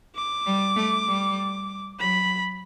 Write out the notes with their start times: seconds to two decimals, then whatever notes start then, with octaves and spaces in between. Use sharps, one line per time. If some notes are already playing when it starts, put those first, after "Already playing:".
0.16 D6
0.47 G3
0.77 A3
1.07 G3
1.99 F#3 B5